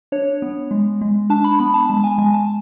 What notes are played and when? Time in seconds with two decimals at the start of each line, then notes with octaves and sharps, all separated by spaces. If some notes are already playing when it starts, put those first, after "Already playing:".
0.12 D4 C#5
0.42 B3
0.71 G#3
1.01 G#3
1.30 D4 A5
1.44 B5
1.59 B3 B5
1.74 A5
1.89 G#3 A5
2.04 G#5
2.18 G#3 G#5
2.34 A5